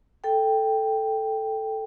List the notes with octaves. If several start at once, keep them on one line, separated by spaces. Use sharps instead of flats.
A4 G5